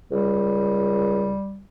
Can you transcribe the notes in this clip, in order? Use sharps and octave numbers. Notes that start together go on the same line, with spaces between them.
C#2 G3